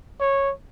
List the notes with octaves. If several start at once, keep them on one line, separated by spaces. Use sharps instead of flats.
C#5